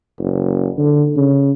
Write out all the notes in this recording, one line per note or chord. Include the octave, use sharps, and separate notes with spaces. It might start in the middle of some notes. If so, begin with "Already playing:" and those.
F#1
D3
C#3